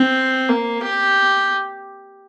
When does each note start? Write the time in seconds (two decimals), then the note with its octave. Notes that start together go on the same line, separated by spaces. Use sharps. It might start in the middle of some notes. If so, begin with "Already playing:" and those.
Already playing: C4
0.49 A#3
0.82 G4